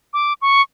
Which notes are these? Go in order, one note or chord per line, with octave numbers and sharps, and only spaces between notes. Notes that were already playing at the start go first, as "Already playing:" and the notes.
D6
C#6